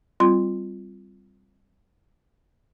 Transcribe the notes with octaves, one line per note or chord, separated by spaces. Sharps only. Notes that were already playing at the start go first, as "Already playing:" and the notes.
G3 C4 F4 C6